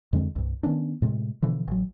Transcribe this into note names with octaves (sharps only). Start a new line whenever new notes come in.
F2 D3 G#3 C4
C2 G2
D#3 B3 C#4 D4
A2 C3 G#3
B2 D3 E3 F3
A1 F#3